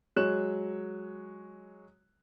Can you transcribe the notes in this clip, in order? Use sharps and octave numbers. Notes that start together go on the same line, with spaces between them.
F#3 G#3 C#5 F#6 E7